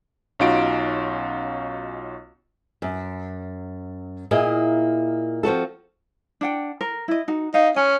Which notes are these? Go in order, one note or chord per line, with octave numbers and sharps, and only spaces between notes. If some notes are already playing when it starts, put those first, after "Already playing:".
B1 C#4 D#4 F4 F#4 D7
F#2
A#2 A#3 E4 G#4 D#5
F3 C4 F#4 A4
D4 F#5 G5
A#4
E4 D#5
D#4 F#4
D#4 F5
C#4 G#5